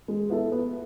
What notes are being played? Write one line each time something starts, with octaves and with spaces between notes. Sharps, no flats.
G#3
B3 E4 A4
B3